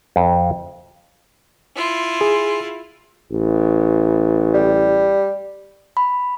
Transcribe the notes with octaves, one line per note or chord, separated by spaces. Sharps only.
F2
E4 F4
G#4
A1
G3
B5